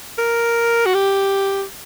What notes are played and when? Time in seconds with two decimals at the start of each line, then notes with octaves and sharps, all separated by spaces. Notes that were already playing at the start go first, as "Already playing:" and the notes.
0.18 A#4
0.86 F#4
0.94 G4